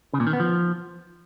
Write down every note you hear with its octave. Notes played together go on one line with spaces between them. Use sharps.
C#3
A#2
D#3
B3
F3